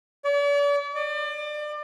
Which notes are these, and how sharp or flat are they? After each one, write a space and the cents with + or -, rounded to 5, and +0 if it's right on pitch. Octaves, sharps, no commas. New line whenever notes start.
D5 -45
D5 +30